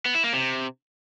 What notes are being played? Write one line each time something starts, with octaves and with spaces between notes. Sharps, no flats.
B3
E4
A#3
C3